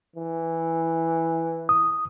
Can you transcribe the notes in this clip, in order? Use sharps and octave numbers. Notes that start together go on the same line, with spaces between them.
E3
D#6